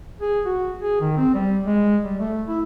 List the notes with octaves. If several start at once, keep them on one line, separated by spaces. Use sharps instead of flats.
G#4
F#4
G#4
D#3
C4
G3
G#3
G3
A3
E4